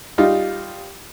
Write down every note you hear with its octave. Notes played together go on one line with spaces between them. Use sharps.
G3 D#4 F4